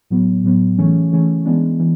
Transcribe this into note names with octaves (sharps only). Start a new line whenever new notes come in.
A2 F#3 B3
A2 F#3 B3
C#3 E3 A3 C#4
C#3 E3 A3 C#4
E3 G#3 B3 D4
E3